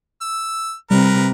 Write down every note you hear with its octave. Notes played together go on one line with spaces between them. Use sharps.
E6
C3 G3 A#4 B4